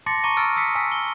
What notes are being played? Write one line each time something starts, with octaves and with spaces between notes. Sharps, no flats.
A5 C6 D6 A6 A#6 C#7
A#5 C#6 D6 D#7
E6 F6 A6 D7
D#6 E6 B6 C#7
G#5 E6 B6
G7